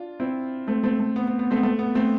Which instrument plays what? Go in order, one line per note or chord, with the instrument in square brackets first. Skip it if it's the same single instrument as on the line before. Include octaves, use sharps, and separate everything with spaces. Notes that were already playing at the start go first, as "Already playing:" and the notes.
Already playing: [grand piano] D4 F4
C4 E4
A3 C4
A3 C4
A3
B3
B3
B3
A3 C4
B3
A3
B3
A3 C4